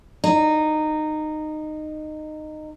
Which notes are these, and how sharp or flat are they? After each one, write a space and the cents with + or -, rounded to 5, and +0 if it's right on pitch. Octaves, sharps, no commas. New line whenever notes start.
D#4 -15